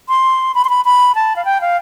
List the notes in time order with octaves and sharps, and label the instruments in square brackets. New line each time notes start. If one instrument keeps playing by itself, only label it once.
[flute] C6
B5
C6
B5
B5
A5
F5
G5
F5